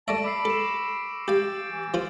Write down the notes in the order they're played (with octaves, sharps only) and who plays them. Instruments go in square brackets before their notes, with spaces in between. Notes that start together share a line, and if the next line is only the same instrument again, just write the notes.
[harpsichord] A3 D5 E5 [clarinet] A5 [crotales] C#6 A#6 D7
[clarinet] B5 [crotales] D6 E6 C7
[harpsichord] A4 [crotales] C#7 E7
[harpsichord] G4 F5 [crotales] G6 A6 D7
[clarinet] E3
[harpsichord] F3 F4 C5